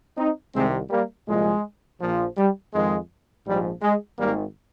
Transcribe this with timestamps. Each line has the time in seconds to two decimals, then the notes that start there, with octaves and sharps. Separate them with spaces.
0.17 C4 D#4
0.54 C2 C3 D#3 G#3 C4
0.90 G3 A#3
1.27 C2 A#2 F3 G#3
2.00 A#1 A#2 F3
2.37 G3
2.73 F2 D#3 G#3
3.46 A#1 G#2 F3 G3
3.82 G#3
4.18 G#1 G#2 D#3 G3 A#3